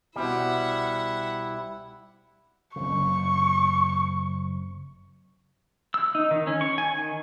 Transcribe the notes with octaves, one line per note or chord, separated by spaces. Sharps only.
C2 B2 G3 E4 C5 E5 F#5
F#1 C3 C#6
E6
D#4
D#3
C#4
C#6
G#5
D#3